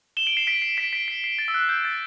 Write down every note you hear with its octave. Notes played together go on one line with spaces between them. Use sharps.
E7 G7
D7 F#7
C7 E7
B6 D7
C7
B6 D7
B6 D7
C7
C7
A6
E6
F#6
G6
A6